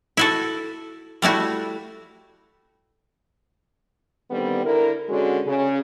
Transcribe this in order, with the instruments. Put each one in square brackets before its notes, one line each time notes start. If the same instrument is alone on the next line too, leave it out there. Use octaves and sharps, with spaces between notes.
[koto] E4 F#4 A4
G3 A3 E4 F#4
[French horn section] D3 D#3 G3 B3 C4
D3 E4 A#4
D3 G#3 C#4 F#4
C#3